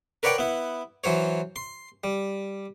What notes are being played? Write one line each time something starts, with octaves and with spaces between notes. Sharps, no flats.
A#4 B4 C#5 D5 F#5 G5
B3 E4
E3 F#3 C5 C#5
C6
G3